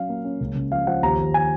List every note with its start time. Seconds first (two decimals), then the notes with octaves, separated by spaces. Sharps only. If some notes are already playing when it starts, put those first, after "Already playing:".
Already playing: F#3 C#4 F5
0.09 A#3
0.24 C#4
0.41 C#2
0.56 C#2
0.72 F3 F5
0.87 F3 F#5
1.02 D#2 A#5
1.18 D#2
1.34 G#5